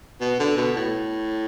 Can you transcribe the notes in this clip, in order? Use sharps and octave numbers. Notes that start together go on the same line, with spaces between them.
B2
D3
B2
A2